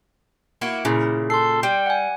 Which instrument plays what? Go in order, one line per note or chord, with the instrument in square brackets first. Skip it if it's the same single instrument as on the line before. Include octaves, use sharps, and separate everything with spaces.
[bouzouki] A#3 E4 F#4
[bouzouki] A#2 C#3 [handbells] C#4 E4 G#4
[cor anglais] A4 [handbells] C6 C7
[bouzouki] G3 [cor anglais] G5
[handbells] F#5 G#5